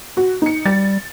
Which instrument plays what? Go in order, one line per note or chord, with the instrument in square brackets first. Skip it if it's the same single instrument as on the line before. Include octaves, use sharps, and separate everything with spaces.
[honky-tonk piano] F#4
D#4 C#7
[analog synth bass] G3 [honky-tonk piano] A6